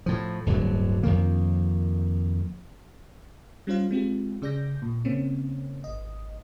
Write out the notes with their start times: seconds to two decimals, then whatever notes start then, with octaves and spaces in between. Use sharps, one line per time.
0.06 A2 F3
0.46 D1 G1 D3 F#3
1.03 F2 D#3 A#3
3.67 G3 C#4 F4 C5 F5
3.91 G#3 C4 F4 G4
4.42 C#3 G#4 D5 D6 G6 A#6
4.82 A#2
5.05 C#3 A#3 C4 C#4
5.84 G#1 D#5